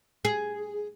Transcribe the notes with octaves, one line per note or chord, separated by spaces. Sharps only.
G#4